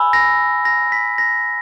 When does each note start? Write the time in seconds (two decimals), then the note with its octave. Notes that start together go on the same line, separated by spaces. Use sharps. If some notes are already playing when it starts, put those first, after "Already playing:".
Already playing: G#5 B5 E6
0.13 A#6
0.65 A#6
0.92 B6
1.18 A#6